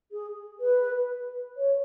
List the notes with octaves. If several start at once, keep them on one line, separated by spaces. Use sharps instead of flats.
G#4
B4
C#5